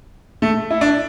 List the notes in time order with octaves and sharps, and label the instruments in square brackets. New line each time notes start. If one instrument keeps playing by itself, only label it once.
[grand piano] A3
E4
D4